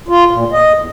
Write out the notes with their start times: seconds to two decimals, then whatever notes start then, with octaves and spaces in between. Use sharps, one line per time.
0.09 F4
0.31 A#2
0.52 D#5
0.79 E2